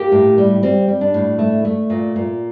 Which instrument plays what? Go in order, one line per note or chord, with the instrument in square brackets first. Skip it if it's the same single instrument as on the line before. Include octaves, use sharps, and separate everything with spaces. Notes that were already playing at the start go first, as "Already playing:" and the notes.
Already playing: [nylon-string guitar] A#3 G4
A2
G3
G3 C4
G3
D4
A2
A3
A3
A#2
A#2